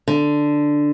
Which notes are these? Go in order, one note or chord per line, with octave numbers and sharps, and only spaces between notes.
D3